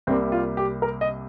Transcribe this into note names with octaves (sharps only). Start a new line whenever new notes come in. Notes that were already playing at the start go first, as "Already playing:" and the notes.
C2 C3 G3 A#3 C4
F4
G4
A#4
D#5